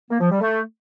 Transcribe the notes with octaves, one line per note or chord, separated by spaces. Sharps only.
A#3
F3
G3
A3